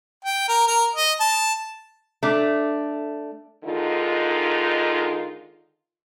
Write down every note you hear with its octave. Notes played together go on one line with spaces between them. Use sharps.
G5
A#4
A#4
D#5
A5
A3 D4
D3 D#3 G#3 D#4 F4